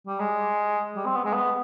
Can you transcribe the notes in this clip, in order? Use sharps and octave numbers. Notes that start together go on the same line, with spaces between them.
G3
G#3
G3
C4
B3
G#3
B3